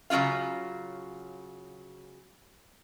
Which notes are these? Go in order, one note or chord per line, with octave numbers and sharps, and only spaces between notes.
C#3 F#3 E4 F4 F5